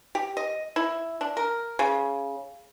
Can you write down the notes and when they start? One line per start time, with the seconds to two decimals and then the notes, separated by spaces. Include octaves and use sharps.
0.15 G4
0.37 D#5
0.76 E4
1.21 D4
1.37 A#4
1.79 C#3